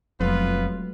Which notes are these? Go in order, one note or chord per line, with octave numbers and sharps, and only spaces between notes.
E1 F2 F#3 G#3 A3 B3 F4 B4